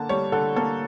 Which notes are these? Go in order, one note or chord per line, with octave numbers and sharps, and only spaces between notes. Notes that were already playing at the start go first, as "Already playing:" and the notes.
Already playing: D3 A#3 A5
G3 C#5
D3 A4
A#3 A4